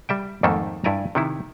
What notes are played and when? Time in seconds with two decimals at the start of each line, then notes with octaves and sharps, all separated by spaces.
0.09 G3 E5 G5
0.43 F2 G#2 D#3 A3 A#3 A4
0.84 G2 E4 D5 G#5 A#5
1.15 C3 D#3 E4